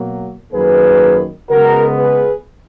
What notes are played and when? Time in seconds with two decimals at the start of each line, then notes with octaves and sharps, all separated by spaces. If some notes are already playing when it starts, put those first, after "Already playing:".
Already playing: B2 F#3 A#3
0.53 F#2 D#3 A#3 G#4 B4
1.50 C#3 G#3 B3 F#4 A#4
1.99 G#4 B4